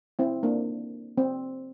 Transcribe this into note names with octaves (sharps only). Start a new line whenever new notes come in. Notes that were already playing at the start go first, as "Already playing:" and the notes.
C4 E4
A#3 D4
C4